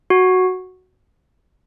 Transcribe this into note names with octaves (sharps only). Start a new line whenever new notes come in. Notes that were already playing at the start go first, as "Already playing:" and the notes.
F#4